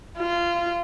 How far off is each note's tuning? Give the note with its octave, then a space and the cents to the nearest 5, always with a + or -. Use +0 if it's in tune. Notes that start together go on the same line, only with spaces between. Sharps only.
F4 -20